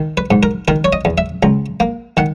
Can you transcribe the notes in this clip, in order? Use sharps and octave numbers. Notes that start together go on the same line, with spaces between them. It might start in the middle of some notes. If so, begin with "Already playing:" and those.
Already playing: D#3
B4
G#2
A#4
D#3 A#4
C#5
D#5
E2
E5
C#2 A#5
A#3
D#3 F#5